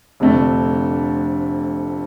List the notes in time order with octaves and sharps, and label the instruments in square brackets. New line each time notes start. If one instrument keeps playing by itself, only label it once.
[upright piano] F1 F2 D3 A3 D4